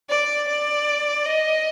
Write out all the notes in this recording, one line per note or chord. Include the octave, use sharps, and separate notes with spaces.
D5
D5
D#5